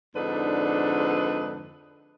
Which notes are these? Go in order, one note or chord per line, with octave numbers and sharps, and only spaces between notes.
F2 G#2 D3 D4 D#4 B4